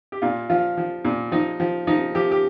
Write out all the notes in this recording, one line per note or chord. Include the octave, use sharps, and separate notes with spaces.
G4
A#2 F4
F3 F4
F3
A#2
F3 D#4
F3
F3 D#4
F3 G4
G4